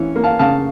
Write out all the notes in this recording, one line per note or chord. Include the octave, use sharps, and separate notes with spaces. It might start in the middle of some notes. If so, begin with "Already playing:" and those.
Already playing: E3 C#4 C#5
A#3
F5 A5
C#3 F5 A5